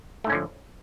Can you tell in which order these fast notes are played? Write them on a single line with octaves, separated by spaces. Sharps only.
A3 G#2 C#4 D3 F3